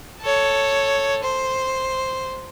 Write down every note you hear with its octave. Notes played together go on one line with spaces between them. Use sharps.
A4 C#5
C5